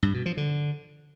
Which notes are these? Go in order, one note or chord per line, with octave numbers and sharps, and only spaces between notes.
G2
B2
F3
D3